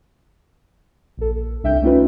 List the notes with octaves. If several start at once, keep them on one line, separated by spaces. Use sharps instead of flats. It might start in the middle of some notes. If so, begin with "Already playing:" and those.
A#1 A4
C2 D4 E5 G5 G6
A3 C#4 D#4 F4 B4